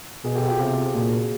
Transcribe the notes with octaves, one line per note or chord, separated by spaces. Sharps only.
B2 F#4 G#4
G4 A4
F4 G4
C3 F4 G4
A#2 F#4 G#4